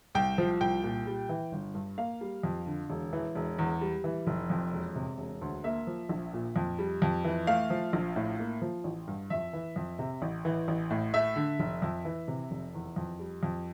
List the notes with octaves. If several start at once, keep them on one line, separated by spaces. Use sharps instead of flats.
C2 G5
F3
C2 G5
A#2
G3
E3
G1
G2
A#3 F5
G3
F2
D3
E1
E3
E1
E2
G3
E3
F1
F2
E1
C3
E1
D2
A#3 E5
F3
A#1
A#2
F2
G3
F2
E3
A3 F5
F3
A#1
A2
A#3
F3
A1
G2
F2 E5
E3
F2
C3
A1
E3
A1
A2
A3 E5
D3
F1
F2
E3
C3
F1
E2
F2
G3
F2